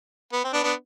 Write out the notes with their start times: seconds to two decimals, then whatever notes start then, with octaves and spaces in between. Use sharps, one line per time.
0.33 B3
0.44 C4
0.53 B3 D4
0.63 B3 D4